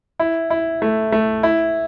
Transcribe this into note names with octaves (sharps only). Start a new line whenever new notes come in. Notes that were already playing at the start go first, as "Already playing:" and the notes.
E4
E4
A3
A3
E4